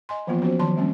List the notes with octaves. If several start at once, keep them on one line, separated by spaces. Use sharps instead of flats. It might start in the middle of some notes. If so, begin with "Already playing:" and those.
D#5 G#5 C6
E3 F3 A#3 B3 F4
F3 B3 C#4 F#4 C5
D#3 F3 F#3 A5 B5 C6
G3 A#3 C4 C#4